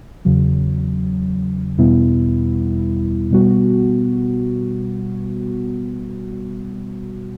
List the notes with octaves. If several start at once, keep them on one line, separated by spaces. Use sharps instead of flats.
E2 C#3 F#3
E2 B2 G3 B3 E4
B2 G3 B3 F#4